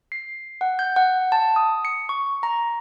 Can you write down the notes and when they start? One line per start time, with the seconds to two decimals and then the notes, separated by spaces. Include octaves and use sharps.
0.12 C7
0.61 F#5
0.79 G6
0.96 F#5
1.32 A5
1.56 D#6
1.85 C#7
2.09 C#6
2.43 A#5